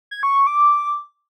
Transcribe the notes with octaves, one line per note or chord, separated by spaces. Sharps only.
G#6
C#6
C#6
D6